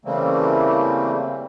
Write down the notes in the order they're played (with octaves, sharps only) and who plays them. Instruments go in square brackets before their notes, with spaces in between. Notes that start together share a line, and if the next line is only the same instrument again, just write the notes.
[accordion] C#3 E3 G3 A3 A#3 C4